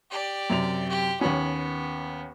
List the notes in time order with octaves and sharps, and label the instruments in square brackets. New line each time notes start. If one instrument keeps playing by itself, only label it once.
[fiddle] G4 D5
[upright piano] F#2 C3 F7
[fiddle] G4
[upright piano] D#2 C#4 [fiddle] B3